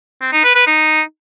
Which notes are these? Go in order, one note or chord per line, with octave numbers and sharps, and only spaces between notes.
C4
D#4
B4
B4
D#4